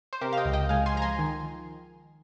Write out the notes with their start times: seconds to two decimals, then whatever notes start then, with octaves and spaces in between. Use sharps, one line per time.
0.13 C5
0.21 C3 G4 A#4
0.33 F5
0.37 D#5 G5
0.45 C#2
0.53 D#5 G5
0.69 G#3 F5 G#5
0.86 G#5 C6
0.95 F3 A#5
1.02 G#5 C6
1.19 D#3